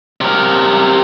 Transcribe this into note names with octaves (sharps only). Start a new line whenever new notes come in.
C3 A#4